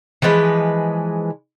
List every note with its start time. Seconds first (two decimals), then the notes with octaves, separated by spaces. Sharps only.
0.22 E3 F3 G#3 B4